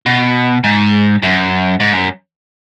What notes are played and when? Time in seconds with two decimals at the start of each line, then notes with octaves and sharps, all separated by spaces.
0.06 B2
0.64 G#2
1.22 F#2
1.80 G#2
1.94 F#2